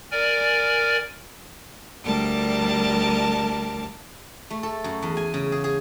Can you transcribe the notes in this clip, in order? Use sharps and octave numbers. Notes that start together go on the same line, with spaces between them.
A#4 D5 G#5
D2 G3 A#4 A5 D6
A3
A4
F#2
E2
G#5
C#3
G#4
G#4